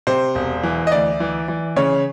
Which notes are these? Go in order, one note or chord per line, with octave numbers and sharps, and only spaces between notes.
C3 C5
E1
E3
D#5
D2 D5
E3
E3
C#3 C#5